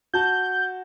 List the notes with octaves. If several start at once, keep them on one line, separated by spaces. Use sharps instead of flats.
F#4 A5 G6